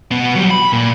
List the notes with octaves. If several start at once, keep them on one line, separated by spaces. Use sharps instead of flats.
B2 B3
F#3 G3
B5
A#2